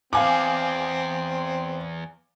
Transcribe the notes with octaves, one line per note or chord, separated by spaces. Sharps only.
E2 C4 F5 G#5 D6